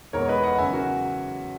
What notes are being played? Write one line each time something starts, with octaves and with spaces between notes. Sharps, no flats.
E2 B2 G#3 A#4 C#5
B4 D#5
D#5 F#5
E2 C#3 F#3 E5 G#5
F#4 A#4